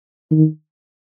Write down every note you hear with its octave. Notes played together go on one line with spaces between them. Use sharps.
D#3